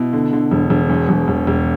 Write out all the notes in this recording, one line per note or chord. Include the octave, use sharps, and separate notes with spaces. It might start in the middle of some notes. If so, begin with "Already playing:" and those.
Already playing: B2 E4
D3
D3
E1
E1
E2
E1
E1
E1